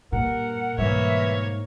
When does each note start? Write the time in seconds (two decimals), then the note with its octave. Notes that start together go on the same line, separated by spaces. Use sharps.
0.12 G2 A#2 A#4 F#5
0.78 G#2 B2 E3 G3 A#3 C#5 E5